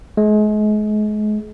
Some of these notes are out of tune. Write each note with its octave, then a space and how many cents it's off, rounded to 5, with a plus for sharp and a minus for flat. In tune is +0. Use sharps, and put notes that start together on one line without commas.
G#3 +35